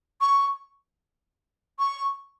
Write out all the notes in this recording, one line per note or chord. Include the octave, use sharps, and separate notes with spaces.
C#6
C#6